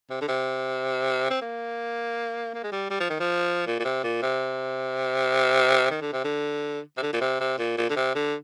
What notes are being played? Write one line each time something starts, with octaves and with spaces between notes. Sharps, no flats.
C3
D3
C3
C4
A#3
A#3
G#3
G3
G3
F3
D#3
F3
A#2
A#2
C3
A#2
C3
D#3
D3
C3
D3
C3
D3
A#2
C3
C3
A#2
A#2
D3
C3
D3